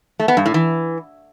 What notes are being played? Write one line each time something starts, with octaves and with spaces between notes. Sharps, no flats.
A3
B3
G2
A2
E3